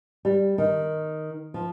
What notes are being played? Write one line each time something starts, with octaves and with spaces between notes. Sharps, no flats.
G3
D#3
F3